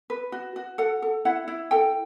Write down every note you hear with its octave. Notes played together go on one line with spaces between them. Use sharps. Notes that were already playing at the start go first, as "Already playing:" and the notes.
B4
F#4
F#4
A4 F#5
A4
E4 F#5
E4
A4 G5